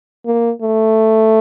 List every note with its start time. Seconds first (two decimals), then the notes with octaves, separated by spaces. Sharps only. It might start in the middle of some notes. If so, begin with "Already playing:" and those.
0.26 A#3
0.62 A3